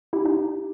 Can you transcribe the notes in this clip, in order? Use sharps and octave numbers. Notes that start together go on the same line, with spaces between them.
E4 G4
D#4